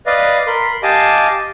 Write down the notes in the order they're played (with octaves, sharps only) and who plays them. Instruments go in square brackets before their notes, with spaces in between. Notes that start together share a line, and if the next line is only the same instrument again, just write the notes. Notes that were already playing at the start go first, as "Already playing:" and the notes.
[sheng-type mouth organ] B4 D5 D#5 F5
A#4 B5 C6
G4 D#5 F5 G#5 A5 D6